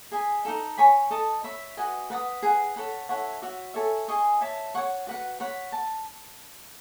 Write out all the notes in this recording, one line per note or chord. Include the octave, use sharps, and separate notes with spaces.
G#4 D#5 G#5 B5
D#4 F#4 A4
C#5 G#5 B5
A4 D#5 A5
C#5 E5 B5
F#4 B4 D#5 G#5
B4 F#5 A5 D#6
G#4 B4 F#5
A4 C#5 F#5 B5
E4 A4 C#5 F#5
F#4 C#5 E5
A4 C#5 E5 G#5
G#4 D#5 G#5 C#6
C#5 E5 A5
C#5 F#5 C#6
F#4 B4 F#5
C#5 F#5 B5
A5